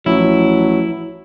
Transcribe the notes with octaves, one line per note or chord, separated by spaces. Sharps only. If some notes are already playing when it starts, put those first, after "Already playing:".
A1 F3 F#3 E4